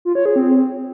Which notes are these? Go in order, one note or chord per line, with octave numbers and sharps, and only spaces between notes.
F4
C#5
G#4
C4